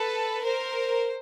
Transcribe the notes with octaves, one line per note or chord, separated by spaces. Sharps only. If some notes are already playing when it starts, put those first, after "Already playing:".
Already playing: A4 B4
A#4 C5